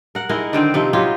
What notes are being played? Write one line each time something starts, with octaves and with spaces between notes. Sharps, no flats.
A#4 F#5
G#3 D#4 E4 A#4
D3 D#3 C4
C3 F3 D#4
F#3 B3 F4 G4